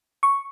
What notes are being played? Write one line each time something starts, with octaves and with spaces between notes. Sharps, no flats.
C#6